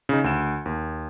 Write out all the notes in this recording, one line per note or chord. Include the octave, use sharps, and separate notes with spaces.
C#3 D#4
D2 E7
D#2